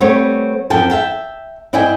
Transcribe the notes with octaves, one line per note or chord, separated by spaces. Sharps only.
G3 A3 B3 C4 C#5
F#2 F3 C4 G5 A5
E5 F5 G5 A5
G2 E4 D5 D#5 G5 G#5